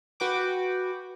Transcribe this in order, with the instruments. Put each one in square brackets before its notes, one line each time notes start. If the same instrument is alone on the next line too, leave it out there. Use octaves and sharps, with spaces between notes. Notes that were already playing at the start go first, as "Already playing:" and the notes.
[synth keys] F#4 B4 G5 D6